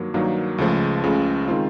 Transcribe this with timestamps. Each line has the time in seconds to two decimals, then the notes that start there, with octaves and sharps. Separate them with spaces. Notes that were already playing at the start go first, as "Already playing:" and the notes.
Already playing: G2 D#3 F#3 A#3
0.14 G2 D#3 F#3 A#3
0.58 C#2 C#3 F3 A3
1.04 C#2 C#3 F3 A3
1.48 D#3 G#3 C4 F4